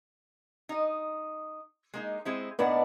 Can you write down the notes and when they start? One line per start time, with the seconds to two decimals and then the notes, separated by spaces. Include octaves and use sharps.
0.69 D#4 D#5
1.94 G#3 A#3 D#4
2.25 G#3 C4 E4
2.59 A2 B3 D4 D#4 D5 F#5